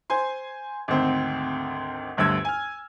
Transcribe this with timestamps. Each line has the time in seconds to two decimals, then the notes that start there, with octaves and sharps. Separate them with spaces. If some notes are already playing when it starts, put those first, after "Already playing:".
0.10 C5 G#5 C6
0.88 G#1 D2 C4
2.17 G1 D2 G2 E6 G#6
2.45 G#5 F6